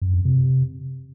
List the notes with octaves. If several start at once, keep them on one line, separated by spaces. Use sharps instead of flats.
F#2
F2
C3